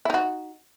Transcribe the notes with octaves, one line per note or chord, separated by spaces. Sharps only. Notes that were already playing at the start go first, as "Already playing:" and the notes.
D#4 E4 F#4